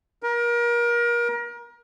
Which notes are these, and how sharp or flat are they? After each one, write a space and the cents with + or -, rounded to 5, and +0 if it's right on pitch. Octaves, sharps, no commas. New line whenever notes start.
A#4 +30